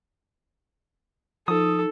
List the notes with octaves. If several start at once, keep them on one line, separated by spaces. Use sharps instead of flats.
F3 D#4 A4 D#6